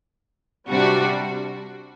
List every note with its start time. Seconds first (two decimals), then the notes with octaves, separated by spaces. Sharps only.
0.68 C3 G3 D4 F#4